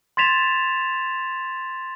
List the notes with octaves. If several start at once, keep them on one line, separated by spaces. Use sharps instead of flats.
C6 G#6 A6 B6 E7 F7